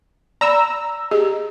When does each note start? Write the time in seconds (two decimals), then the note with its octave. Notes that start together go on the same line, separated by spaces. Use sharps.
0.41 D5 A#5 B5 E6
1.11 G4 G#4 D#5